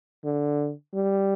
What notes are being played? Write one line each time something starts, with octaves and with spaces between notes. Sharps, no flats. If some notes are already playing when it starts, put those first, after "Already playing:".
D3
G3